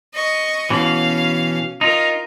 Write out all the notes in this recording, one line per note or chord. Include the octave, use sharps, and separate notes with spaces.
D#5 C#6
B2 E3 C#4 F5
D#4 F4 A#4